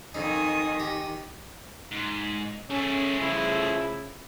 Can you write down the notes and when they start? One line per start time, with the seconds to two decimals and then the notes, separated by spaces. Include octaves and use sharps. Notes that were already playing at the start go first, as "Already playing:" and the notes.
0.15 F2 D#3 D#4 G#5 D#6
0.80 G4
1.91 G#2
2.70 A3 C#4 G#4
3.19 C#3 F3 E4